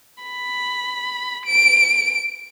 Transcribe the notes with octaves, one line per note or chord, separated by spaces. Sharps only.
B5
D7